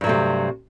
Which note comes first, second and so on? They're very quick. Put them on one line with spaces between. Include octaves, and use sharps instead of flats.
G2 F#3 A3 C3